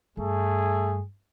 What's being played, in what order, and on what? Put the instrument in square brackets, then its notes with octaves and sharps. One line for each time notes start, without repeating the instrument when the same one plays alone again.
[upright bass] G2 [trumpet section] A3 G#4